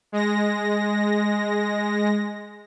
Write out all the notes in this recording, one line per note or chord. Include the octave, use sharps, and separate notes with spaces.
G#3 A#6